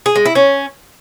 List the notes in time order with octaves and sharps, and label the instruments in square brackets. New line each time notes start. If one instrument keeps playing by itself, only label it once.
[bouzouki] G#4
G#3
E4
C#4